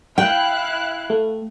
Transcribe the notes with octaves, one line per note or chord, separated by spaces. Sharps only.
E4 F5 G5 F#6
A3